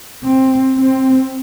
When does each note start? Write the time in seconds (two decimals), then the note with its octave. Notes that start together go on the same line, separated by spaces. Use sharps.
0.25 C4
0.77 C4